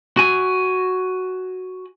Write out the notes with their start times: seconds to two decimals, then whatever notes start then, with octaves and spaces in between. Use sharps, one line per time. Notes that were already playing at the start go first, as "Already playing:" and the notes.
0.17 F#4 G#5